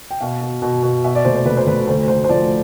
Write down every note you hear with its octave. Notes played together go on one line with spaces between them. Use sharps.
G5
B2 F5
B2
B2
B2
B2 E5
D5
F1 C5
C5
F1 B4
C5
F1 B4
D2 C5
D2 C5
C5
F3 D5